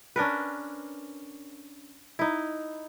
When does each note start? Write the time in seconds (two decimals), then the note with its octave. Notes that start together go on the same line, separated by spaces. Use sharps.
0.16 C#4 D4 A#4 B4
2.19 D#4 E4